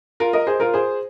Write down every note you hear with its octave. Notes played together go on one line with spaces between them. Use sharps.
F4 A#4
A#4 D#5
G#4 C5
F4 A#4
G#4 C5